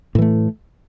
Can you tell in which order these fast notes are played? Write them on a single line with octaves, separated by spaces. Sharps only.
A2 E3 A3